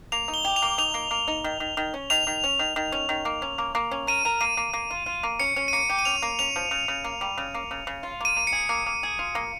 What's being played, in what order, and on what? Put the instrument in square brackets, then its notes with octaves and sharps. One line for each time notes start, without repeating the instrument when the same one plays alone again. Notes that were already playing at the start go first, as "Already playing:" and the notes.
[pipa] A#3 [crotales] F7
[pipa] D#4
[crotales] G7
[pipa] G4
[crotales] F7
[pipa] A#3
[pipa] D#4 [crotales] F7
[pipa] A#3
A#3
D#4
D#3
D#3
D#3
C#4
[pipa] D#3 [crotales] F7
[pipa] D#3
C#4
D#3
D#3
C#4
D#3
A#3
C#4
A#3
A#3
C#4
[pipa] A#4 [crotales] D#7
[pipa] A#4
[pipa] A#3 [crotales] D#7
[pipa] A#3
A#3
F4
F4
A#3
[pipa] C#4 [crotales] C#7
[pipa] C#4
[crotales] D#7
[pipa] A#3 [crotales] C#7
[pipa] G4
[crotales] D#7
[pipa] C#4 [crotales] F7
[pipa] A#3
[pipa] C#4 [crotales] F7
[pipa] F3
C#3
C#3
A#3
G3
C#3
A#3
C#3
C#3
F4
[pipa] A#3 [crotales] D#7
[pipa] A#3
[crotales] C#7
[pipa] G#4
A#3
A#3
G#4
F4
A#3